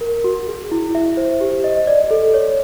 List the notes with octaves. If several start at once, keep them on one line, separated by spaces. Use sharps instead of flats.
A#4
F#4
G#4
E4
E5
C5
G4
D#5
D5
A4
C#5